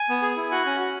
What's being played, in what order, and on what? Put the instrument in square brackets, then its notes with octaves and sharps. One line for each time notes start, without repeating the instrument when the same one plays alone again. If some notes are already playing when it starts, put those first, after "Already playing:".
Already playing: [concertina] G#5
B3
G#4
E4
F#4 F#5
C#4
F#4